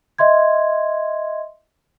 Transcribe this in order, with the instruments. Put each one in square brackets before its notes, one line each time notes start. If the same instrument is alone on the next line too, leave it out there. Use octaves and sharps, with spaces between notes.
[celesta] D#5 E5 C6 G#6